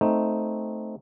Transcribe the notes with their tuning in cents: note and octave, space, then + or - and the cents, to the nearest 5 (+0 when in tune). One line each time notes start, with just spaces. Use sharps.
A3 +0 C4 +0 D#4 +0